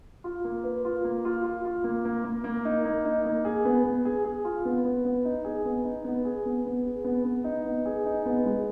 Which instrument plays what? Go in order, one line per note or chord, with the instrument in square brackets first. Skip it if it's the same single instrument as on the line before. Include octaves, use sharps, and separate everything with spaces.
[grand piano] F4
A#3
B4
F4
A#3
F4
F4
F4
A#3
A#3
A#3
A#3
D#4
A#3
D#4
A#3
G#4
B3
B3
G#4
G#4
F4
B3
B3
B3
D#4
G#4
B3
D#4
B3
G#4
B3
B3
G#4
B3
B3
D#4
B3
G#4
D#4
B3
G#3